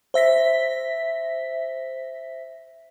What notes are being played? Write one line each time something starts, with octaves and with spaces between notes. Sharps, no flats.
C5 E5 A#6 B6